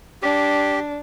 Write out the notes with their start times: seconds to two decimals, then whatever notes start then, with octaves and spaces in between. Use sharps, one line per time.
0.22 D4 G4